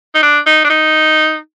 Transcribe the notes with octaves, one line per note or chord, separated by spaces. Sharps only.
D#4
D4
D#4
D4
D#4